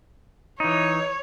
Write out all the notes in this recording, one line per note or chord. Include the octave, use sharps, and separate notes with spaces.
E3 D#4 C#5